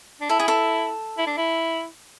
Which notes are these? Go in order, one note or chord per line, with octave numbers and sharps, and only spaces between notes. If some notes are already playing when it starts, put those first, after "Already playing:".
D4
E4 A4
G#4
A4
E4
D4
E4